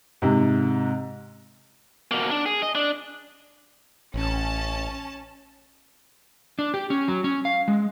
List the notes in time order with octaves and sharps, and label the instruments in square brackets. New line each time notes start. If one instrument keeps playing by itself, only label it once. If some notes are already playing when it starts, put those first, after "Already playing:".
[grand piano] G#2 C3
[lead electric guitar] B2 A#3
D4
G#4
D#5
D4
[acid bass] A1 [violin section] C#4 A5
[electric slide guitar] D4
G4
C#4
F#3
C#4
F5
G#3